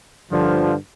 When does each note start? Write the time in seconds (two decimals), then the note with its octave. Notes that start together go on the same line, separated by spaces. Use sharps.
0.30 G2 D3 F3